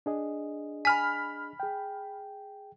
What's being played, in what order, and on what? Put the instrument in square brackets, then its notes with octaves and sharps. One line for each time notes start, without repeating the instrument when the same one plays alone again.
[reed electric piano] D4 G#4 D#5
[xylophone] G#5 [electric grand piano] B5 F6 B6
[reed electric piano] G#4 G5